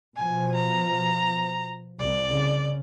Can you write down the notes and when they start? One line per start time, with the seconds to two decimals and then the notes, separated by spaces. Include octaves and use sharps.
0.16 B2 F3 G#5
0.55 A#5
1.99 C2 D5
2.31 C#3